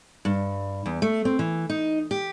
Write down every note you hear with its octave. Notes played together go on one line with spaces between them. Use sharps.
G2
E2
A3
C4
E3
D#4
G4